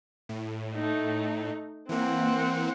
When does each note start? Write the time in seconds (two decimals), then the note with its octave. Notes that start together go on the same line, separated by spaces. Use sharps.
0.29 A2
0.75 A3 D#4
1.89 E3 A#3 C4 F#5